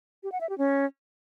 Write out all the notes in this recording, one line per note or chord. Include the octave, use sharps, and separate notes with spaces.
G4
F#5
E5
G4
C#4